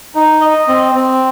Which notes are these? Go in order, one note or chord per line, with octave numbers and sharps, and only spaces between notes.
D#4
D#5
C4
C4